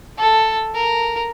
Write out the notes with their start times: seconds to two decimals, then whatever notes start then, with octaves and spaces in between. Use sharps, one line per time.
0.18 A4
0.74 A#4